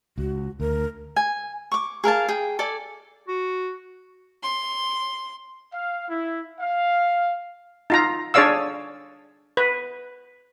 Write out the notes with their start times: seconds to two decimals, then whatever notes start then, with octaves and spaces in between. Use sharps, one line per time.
0.18 C#2 F#4
0.60 D2 A#4
1.16 G#5
1.72 C#6 D6
2.04 G#4 A#4 F5 A5
2.29 G#4 G5
2.59 A4 D5 G#5
3.28 F#4
4.43 C6
5.73 F5
6.09 E4
6.60 F5
7.90 D#4 F4 A#5
8.34 D4 G#4 C#5 D5 F5 E6
9.57 B4